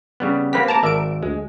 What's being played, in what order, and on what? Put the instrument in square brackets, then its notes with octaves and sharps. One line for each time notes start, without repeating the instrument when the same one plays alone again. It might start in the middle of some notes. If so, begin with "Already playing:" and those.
[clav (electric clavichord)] C#3 G3 B3
[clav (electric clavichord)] A#3 C4 G4 [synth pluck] B4 F#5 B6
[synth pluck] A5 A#5 D6
[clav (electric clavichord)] G#1 D5 E5 [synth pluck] A#4 D7
[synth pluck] D2 [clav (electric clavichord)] G#3